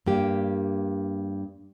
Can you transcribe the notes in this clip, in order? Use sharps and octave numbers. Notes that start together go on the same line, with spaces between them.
G2 A#3 G4